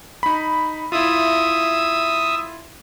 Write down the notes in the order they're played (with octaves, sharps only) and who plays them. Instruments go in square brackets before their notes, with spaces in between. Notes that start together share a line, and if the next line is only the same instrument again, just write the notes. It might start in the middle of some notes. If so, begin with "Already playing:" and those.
[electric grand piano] D#4 B5
[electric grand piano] E4 F4 [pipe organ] E5 D#6